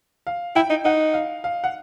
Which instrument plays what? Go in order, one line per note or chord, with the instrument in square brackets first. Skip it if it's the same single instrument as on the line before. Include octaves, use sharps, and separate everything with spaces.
[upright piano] F5
[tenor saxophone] E4 [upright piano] G5
[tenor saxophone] D#4
[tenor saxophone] D#4 [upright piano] F#5
[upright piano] F5
F5
F#5